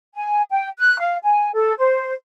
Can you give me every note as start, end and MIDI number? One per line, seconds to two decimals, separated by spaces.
0.15 0.41 80
0.50 0.68 79
0.79 0.98 90
0.98 1.16 77
1.23 1.50 80
1.54 1.72 69
1.78 2.12 72